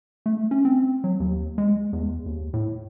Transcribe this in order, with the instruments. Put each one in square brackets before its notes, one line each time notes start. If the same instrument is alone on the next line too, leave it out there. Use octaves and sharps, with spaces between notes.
[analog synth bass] A3
C#4
C4
F#3
D#2
G#3
E2
D#2
A2